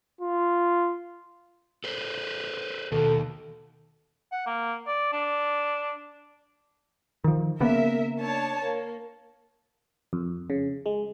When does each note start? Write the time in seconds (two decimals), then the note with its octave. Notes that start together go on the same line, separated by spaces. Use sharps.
0.21 F4
1.84 A4 B4 C5
2.92 D#2 B2 D#3 A4
4.32 F#5
4.47 A#3
4.87 D5
5.13 D4
7.24 D#3 F3
7.60 C#3 A#3 B3 A#4 E5
8.19 D4 C#5 A5
8.65 A#3
10.13 F2
10.50 C#3
10.86 G#3